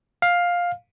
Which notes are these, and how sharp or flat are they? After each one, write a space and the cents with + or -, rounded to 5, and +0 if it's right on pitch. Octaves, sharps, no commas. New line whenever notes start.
F5 +10